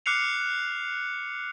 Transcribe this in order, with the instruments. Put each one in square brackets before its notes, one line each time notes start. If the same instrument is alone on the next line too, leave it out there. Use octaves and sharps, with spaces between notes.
[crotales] D6 F6 F#6 C7 C#7 F7